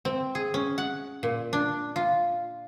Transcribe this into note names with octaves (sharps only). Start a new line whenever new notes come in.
C4
G#4
C#4
F#5
A#2
D4
F4